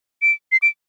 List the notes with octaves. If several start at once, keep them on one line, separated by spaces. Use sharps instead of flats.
D7
C7
D7